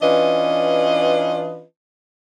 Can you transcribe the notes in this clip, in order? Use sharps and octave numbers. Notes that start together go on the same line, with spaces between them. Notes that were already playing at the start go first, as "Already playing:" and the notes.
E3 C#4 D4 F4 B4 D#5